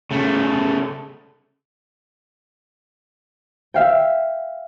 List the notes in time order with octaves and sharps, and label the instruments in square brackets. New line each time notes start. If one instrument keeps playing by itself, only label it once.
[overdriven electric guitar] C#3 A3
[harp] E5 F5 G5